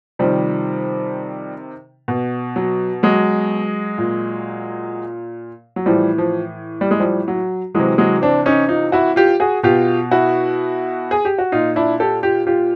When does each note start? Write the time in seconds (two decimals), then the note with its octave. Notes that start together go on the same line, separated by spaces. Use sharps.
0.19 C3 D#3 F3 G3
2.08 B2
2.56 F#3
3.03 F#3 G#3
3.98 A#2
5.76 F#3
5.86 A2 E3 F3 G3
6.18 F3
6.81 G3
6.91 G#3
7.00 F3 G3
7.28 F#3
7.75 C3 E3 F#3 G#3
7.98 F#3 G#3
8.22 C4 D4
8.46 C#4 D#4
8.69 D#4 F4
8.92 E4 F#4
9.16 F4 G4
9.40 F#4 G#4
9.63 B2 F4 G4
10.11 E4 F#4
11.11 G#4
11.25 G4
11.38 F#4
11.52 A#2 D#4 F4
11.76 D4 E4
12.00 G4 A4
12.23 F4 G4
12.47 F4 G4